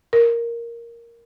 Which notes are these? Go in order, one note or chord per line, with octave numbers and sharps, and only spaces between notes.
A#4